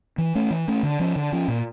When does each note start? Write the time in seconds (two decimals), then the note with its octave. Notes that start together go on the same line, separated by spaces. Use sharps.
0.18 E3
0.35 A3 C#4
0.51 E3
0.68 A3 C#4
0.83 D3
0.99 F3 C#4
1.16 D3
1.32 F3 C#4
1.48 A#2